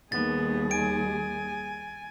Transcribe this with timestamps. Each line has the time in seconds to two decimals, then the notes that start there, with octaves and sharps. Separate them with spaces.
0.12 D#2 G3 B3 G#4 A6
0.71 G#5 D7